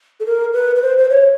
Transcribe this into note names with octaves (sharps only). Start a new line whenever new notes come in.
A4
A#4
B4
B4
C5
C5
C#5